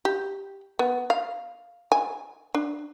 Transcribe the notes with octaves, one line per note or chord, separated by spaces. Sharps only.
G4
B3
F5
G#5
D4